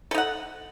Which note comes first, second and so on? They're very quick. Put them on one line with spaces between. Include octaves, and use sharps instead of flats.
A4 D#4 F#5